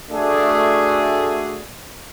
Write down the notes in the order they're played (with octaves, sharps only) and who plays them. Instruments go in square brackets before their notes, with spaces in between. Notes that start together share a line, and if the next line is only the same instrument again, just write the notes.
[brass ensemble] A3 D4 F#4 G#4